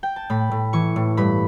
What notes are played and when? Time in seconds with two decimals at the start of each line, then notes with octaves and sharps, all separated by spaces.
0.03 G5
0.16 A5
0.30 A2 B5
0.51 A2
0.73 E3 C#6
0.96 A2
1.17 G2 B5